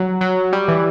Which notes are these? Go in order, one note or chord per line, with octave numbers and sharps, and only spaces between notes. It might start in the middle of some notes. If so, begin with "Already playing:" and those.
Already playing: F#3
F#3
G3
E3